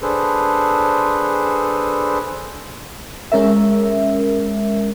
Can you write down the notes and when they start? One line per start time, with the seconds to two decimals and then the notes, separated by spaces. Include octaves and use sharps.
0.01 D4 G#4 A4 B4 C5
3.32 G#3 C#4 A#4 E5